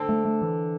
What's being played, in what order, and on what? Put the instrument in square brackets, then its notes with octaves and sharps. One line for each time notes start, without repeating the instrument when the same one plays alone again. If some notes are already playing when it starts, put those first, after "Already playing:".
Already playing: [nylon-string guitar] D3 C4 A4
[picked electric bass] A3
A3
E3